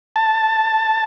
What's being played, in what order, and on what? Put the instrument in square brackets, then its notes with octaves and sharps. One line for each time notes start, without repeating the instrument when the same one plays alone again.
[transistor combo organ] A5